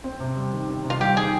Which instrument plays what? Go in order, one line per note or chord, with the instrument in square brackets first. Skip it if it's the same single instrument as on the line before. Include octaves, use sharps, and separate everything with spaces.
[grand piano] C4
C3
G3
D#3
C4
C3
[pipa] F4
[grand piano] G3 [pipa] G4
[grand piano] D#3 [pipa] G#4